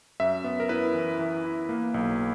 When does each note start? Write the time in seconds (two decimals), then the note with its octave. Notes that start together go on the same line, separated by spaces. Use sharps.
0.20 F#2 E5
0.44 B3
0.60 A#4
0.69 E4 B4
0.94 E3
1.19 E3
1.44 E4
1.69 A#3
1.94 B1